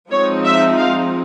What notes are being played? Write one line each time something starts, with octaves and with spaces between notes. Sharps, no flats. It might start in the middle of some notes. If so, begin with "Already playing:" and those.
F3 G#3 C4 D#4 C#5
E5
F5